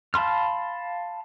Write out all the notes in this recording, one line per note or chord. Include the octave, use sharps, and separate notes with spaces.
F5 A5 B5 C6 F6